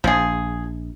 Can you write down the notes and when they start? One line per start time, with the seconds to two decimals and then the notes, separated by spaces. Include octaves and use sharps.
0.04 A#1 F3 G#4